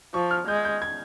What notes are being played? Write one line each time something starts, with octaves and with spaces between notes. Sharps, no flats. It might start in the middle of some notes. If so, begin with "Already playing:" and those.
F3 C#6
F6
G#3 G6
G6
G#6